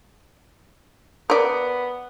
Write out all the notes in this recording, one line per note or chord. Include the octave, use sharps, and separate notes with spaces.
B3 A#4 D5